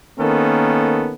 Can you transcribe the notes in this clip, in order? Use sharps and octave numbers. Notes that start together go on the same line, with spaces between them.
D#3 A#3 B3 C#4 A4